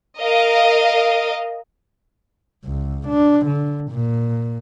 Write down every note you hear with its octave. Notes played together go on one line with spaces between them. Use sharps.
A#4 D#5 F5
C#2
D4
D3
A#2